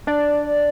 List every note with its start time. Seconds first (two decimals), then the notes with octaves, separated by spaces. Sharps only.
0.07 D4 D5